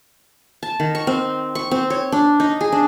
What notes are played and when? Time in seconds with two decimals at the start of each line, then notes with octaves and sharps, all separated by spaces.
0.63 A5
0.80 D#3
0.95 C#6
1.07 C4
1.55 C#6
1.71 C4
1.90 C#5
2.12 D4
2.40 D#4
2.61 G#4
2.72 D4